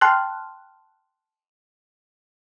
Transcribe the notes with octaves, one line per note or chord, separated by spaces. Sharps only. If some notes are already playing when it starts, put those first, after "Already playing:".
G5 A5 C6 F6 F#6